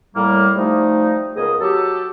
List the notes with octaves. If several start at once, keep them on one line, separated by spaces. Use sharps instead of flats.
A2 G3 A#3
F3 G3 A3 D#4
C#2 B3 G#4 A#4 D#5 D#6
F#3 G4 A4